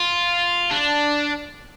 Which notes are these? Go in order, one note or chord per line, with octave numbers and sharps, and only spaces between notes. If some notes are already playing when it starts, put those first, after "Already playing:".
Already playing: F4
D4